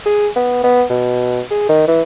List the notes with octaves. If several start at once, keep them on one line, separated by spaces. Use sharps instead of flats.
G#4
B3
B3
B2
G#4
D#3
E3